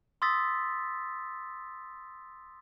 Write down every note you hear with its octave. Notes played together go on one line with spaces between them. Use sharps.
C6 D#6 E6 A6 B6